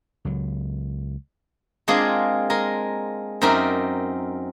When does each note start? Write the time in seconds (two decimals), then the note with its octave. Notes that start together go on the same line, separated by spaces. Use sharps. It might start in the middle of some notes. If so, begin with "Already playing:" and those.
0.25 C#2 F#3
1.88 G#3 A#3 C4 D4 F4 G#4
2.50 G#3 A#4
3.41 F#2 C4 D#4 A#4 D5 E5